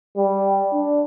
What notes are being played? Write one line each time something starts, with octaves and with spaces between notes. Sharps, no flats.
G3
D4